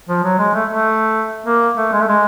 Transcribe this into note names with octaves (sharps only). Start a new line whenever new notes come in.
F3
F#3
G#3
A3
A3
A#3
A3
G#3
A3
G#3